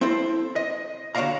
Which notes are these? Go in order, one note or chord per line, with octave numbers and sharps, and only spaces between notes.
C4 E4 A4 C5
D#5
D3 F#4 C#5 D5 F5 A#5